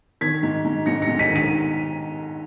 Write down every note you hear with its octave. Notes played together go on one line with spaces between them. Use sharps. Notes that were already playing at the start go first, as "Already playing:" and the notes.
D#3 G#6 B6
G#2
G#2
G#2 A#6 C#7
A#6 C#7
G#2
B6 D#7
D#3
B6 D#7